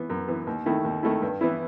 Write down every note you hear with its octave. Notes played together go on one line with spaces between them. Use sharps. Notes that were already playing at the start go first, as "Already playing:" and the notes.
Already playing: E3 B3
F#2
E3 B3
D#2
D#3 A3 E4
D#2
D#3 A3 E4
G2
E3 B3 E4